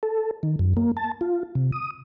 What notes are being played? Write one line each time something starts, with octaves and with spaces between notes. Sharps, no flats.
A4
D#3
F#2
A#3
A5
F4
C3
D#6